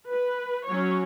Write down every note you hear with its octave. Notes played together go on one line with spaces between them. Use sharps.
B4
F#3 C#4 C#5